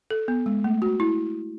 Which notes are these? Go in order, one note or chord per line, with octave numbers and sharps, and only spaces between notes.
A4
B3
G#3
A3
F#4
E4